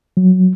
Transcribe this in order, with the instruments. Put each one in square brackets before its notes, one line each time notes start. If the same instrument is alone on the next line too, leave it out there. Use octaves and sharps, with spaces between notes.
[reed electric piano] F#3